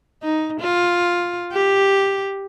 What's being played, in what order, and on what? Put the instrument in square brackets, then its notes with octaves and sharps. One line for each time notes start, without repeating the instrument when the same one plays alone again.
[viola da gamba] D#4
F4
G4